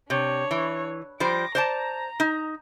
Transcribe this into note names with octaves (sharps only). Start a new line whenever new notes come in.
C3 D4 C#5
E3
F3 G3 C5 D6 A#6
C5 D5 A5 A#5
D#4